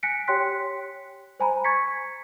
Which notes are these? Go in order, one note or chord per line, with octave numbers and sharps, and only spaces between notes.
G#5 F#6 A#6 B6 C#7 D7
G4 C#5 G5 C6 F#6 B6
C5 G#5 A#5 B5
C#6 G#6 A6 B6 C#7